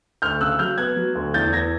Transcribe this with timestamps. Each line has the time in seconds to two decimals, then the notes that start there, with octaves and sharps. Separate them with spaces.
0.22 D2 F6 G6
0.41 C#3 E6 F#6
0.59 F#3 F6 G6
0.78 B3 F#6 G#6
0.96 F#3
1.15 D2
1.34 E2 G6 A6
1.53 E3 G#6 A#6